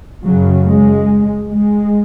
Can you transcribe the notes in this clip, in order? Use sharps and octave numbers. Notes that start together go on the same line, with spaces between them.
F#2 C#3 F#3
G#3
G#3